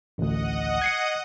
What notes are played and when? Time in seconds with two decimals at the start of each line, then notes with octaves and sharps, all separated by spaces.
0.18 A1 D2 D#5 F#5 D#6
0.82 G#6 C7 C#7